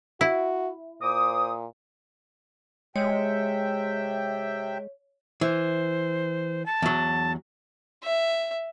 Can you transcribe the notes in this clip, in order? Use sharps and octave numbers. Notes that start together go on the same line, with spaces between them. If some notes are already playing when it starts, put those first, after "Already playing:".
E4 F#4
A#2 C5 D6 D#6
C3 G#3 C#5 E5 G5
E3 C5
A5
E2 F#3
E5